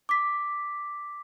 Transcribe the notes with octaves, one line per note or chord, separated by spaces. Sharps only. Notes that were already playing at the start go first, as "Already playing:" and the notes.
D6 B6